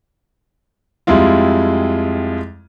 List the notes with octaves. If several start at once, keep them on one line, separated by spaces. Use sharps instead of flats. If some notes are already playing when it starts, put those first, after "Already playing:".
F2 G3 G#3 E4 F4